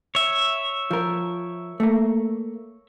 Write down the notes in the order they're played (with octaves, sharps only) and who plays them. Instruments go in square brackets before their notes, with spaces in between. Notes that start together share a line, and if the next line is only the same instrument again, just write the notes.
[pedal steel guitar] C#5 E5
[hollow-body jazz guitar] F3 A#4
A3 A#3